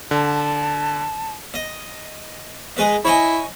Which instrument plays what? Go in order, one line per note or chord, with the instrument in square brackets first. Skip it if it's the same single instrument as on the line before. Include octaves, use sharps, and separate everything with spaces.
[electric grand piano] D3 [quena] A5
[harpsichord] D#5
G#3 B4 D#5
[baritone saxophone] E4 [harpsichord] C#5 D#5 G#5